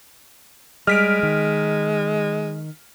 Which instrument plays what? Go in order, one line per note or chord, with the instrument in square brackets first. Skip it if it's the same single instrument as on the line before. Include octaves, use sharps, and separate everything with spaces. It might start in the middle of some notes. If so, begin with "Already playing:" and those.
[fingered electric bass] G3 [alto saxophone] G#3 [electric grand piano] F6 B6 D7
[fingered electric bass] D#3